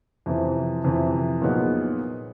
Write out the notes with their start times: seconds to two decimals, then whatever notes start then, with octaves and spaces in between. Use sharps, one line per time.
0.26 F2 C3 E3
0.84 F2 C3 E3
1.42 A#2 F#3 B3 D#4 G#4